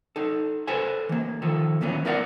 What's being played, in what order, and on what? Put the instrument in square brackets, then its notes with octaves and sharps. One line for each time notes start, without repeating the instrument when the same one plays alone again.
[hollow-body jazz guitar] D#4 A4
A4 B4 C5 G#5
E3 A#3
D#3 F3 A4
D#2 A#2 E3 F#3 B3 C#4
B3 E4 A#4 D5 E5 F#5